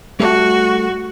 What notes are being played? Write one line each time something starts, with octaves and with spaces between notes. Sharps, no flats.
G3 A3 F#4